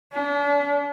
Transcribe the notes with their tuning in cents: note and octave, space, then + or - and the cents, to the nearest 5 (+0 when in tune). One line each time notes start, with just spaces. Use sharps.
D4 -40